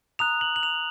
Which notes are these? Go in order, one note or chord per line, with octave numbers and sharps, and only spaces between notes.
A#5 D#6 F#6 F7
F#7
F#7
F7